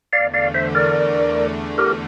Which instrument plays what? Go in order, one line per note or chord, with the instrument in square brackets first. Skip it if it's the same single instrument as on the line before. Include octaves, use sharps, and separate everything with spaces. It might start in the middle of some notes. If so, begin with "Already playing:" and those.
[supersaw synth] E2 D3 A3 [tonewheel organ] D5 F5
[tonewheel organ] D5 F5
C5 E5
A#4 D5
G4 A#4